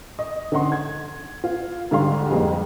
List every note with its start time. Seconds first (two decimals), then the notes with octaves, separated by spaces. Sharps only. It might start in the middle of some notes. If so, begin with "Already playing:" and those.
0.19 D#5
0.52 D3 C#4 D#4 F#5 C6
0.72 G#6
1.44 F4
1.91 G#2 D3 G3 F5 C6
2.31 F2 G3 G#3 A#3